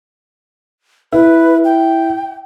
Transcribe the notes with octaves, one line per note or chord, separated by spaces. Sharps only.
E4 B4
G5